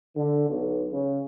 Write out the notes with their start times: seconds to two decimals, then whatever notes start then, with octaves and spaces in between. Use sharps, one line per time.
0.16 D3
0.49 B1
0.92 C#3